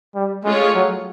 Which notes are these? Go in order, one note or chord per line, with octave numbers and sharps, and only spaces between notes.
G3
G#3 A3 C#4 F4 G#4 C#5
F#3